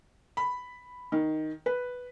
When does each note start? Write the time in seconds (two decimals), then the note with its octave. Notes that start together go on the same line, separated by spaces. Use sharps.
0.37 B5
1.12 D#3
1.66 B4